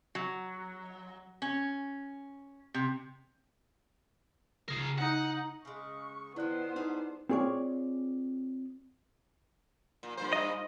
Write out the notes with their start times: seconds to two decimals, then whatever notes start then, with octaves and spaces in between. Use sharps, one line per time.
0.15 F#3
1.42 C#4
2.74 C3
4.68 C#3 F4 G#4 A#4
4.98 D#4 F#5
5.65 C#3 G#3 C#6
6.36 D#3 F3 B3 E4 C5 D5 F#6
6.76 G3 D4 D#4 G#4
7.29 C4 F4 G#4 C#5 D5
10.03 A#2
10.17 G2 A#2 C5
10.33 D#5